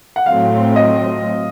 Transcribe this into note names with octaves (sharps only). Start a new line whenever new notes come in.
F#5
A2 F#3 A3 C4 F5
D#5